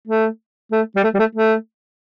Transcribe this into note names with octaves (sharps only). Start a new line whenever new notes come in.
A3
A3
G3
A3
G3
A3
A3